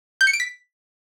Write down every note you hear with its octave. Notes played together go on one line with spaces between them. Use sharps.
G6
C#7
D7
B6